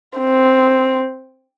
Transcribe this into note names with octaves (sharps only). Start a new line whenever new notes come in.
C4